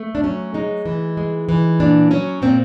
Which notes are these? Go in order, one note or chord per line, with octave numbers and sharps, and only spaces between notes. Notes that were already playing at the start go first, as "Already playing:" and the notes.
Already playing: A3
D4
F#3 C#4
G#3 D#4
E3
G#3
E3
A#2 D4
F#3 C#4
A#2 C4